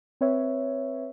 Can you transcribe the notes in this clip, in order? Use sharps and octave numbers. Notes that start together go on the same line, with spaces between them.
C4 B4 C#5 E5